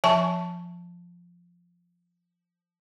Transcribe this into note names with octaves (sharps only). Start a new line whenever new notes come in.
F3 E5 G#5 A5 C#6